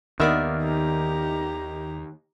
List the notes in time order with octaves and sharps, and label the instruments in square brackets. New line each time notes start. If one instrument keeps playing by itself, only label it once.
[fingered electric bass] D#2 [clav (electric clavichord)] D#3 E5 [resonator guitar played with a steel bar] B3 A#4 D5
[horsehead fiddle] G4 A#5